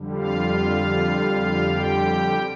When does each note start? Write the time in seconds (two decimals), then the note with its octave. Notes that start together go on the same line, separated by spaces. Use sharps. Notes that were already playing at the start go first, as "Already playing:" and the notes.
Already playing: F2 D3 G3
0.17 F4 F5
1.75 G4 G5